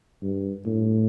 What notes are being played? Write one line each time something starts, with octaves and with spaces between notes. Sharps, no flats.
G2
A2